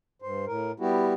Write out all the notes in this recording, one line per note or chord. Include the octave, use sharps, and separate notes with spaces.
G2 C5
A2 A#4
G3 B3 E4 F#4 G4